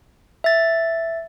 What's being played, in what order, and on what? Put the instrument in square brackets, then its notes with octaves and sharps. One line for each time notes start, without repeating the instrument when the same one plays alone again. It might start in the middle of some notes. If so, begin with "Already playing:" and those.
[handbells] E5 A6